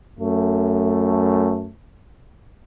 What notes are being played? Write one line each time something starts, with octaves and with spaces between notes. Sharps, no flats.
F#2 A3